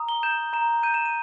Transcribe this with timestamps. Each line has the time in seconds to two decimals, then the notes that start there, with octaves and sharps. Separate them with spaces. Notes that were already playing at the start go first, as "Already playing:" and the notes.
Already playing: A#5 D#6
0.09 G7
0.23 G6 E7
0.53 A#5 E7
0.83 G6 D#7
0.94 E7
1.05 D#7